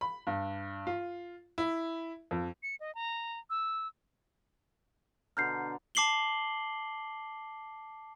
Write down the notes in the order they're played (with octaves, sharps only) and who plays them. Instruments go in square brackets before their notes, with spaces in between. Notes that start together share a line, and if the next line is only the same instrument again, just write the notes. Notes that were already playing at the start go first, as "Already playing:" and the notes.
[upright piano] B5
G2
F4
E4
F2
[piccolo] C#7
D#5
A#5
E6
[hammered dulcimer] B2 D3 A#5 [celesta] F6 G6 C7
[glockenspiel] A5 D6 C7 F#7 G7